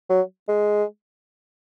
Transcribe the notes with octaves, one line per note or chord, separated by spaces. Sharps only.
F#3
G#3